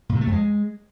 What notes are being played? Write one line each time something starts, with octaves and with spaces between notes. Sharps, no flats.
A#2
C3
A3
F2
G#3